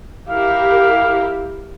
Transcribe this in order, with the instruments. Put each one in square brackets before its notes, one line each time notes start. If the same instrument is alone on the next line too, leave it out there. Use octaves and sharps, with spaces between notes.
[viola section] E4 G4 A#4 [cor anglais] F5